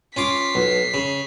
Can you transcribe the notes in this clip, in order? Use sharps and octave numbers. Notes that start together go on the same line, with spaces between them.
C#4 F4 D6 B6 C7
B1
C#3